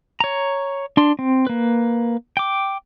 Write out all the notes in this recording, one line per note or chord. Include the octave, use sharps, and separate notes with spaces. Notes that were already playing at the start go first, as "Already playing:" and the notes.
C#5 A#5
D4 C6
C4
A#3 B4
G5 D6